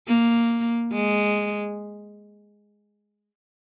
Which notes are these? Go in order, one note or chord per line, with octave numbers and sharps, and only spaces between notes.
A#3
G#3